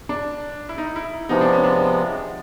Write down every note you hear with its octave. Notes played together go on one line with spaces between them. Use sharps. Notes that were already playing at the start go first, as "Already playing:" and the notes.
D4
E4
D#4
E4
C3 F3 G#3 B3 D#4
D4
C#4
D4